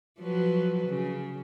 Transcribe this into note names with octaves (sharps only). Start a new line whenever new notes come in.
F3 F#3 B4
C#3